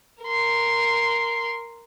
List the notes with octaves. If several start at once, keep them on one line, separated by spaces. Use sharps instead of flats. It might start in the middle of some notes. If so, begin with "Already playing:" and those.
A#4 C6